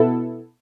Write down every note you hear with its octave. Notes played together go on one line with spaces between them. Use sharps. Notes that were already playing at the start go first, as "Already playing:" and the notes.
Already playing: B2 B3 E4 A4